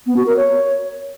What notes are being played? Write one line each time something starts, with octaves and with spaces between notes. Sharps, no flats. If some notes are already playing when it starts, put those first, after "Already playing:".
B3
F#4
A#4
C#5